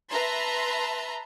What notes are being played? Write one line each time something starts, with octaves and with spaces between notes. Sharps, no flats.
B4 E5 A5 A#5 C6